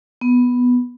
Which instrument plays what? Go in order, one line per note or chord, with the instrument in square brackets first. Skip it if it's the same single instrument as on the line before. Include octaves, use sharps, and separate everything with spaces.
[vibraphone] B3